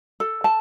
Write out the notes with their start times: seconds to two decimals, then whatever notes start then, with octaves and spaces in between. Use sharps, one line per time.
0.20 A4
0.44 A5